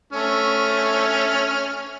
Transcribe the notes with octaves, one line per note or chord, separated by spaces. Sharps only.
A3 C#4 F6